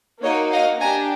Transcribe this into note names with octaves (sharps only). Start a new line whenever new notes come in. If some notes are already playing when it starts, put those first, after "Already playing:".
A#3 D#4 F#4 C#5 D#5
D#5 F5
D4 G4 G#5 A#5